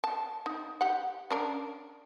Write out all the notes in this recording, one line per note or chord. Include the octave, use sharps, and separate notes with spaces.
A5
D#4
G4 F#5
C#4 D4 A#4